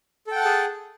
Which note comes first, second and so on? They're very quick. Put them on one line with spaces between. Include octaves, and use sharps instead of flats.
A4 G5 F#5 A5 G#4